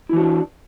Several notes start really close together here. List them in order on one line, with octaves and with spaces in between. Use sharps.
E4 E3 F#4 D4